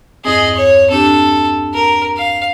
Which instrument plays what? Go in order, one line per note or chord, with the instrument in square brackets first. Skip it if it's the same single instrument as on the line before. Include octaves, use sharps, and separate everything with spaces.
[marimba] E2 G2 C4 [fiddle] G#4 D#5
[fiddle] C#5
[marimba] C4 D4 G4 [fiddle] A4
[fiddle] A#4
F5